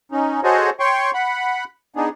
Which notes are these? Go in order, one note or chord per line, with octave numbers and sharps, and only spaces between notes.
C#4 D#4
F#4 G#4 A4 C5 C#5 D#5
C#5 G5 C6 C#6
F#5 B5
B3 D4 D#4 G#4